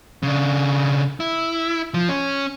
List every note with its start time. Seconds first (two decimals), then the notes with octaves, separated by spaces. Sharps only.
0.23 C#3 D4
1.20 E4
1.94 F3
2.09 C#4